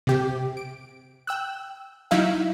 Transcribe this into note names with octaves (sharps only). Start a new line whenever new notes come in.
C3 G4
D7
G5 E6 F#6
F#3 D#4 E4 E5 F5